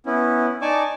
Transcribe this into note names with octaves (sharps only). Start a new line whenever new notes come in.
B3 C#4 E4
D#4 D5 G#5 A5 C#6 D6